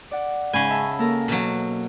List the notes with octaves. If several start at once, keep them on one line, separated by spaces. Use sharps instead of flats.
D5 F#5
G#2 C#3 C#4 G#5 B5
D#5 E5 A5
A#3 A4 A#4
B2 F#3